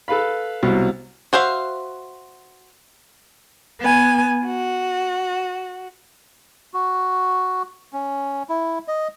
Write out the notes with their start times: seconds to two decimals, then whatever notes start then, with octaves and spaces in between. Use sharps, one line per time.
0.08 A4 B4 F5 B5
0.63 C2 B2 F#3
1.33 F#4 C5 E5 F5
3.81 B3 G#5
4.46 F#4
6.74 F#4
7.93 C#4
8.49 E4
8.88 D#5